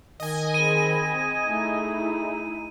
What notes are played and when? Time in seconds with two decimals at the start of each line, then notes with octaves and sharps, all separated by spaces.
0.20 D#3 D#5 G#5
0.54 C4 G#4 B5 D#7
1.47 A3 D#4 E4 G#4